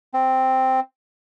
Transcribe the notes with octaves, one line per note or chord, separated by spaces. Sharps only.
C4